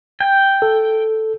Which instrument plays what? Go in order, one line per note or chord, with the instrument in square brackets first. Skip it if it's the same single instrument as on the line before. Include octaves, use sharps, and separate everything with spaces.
[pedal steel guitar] G5
[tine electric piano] A4